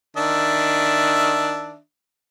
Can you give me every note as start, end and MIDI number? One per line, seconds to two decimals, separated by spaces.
0.17 1.78 51
0.17 1.78 62
0.17 1.78 76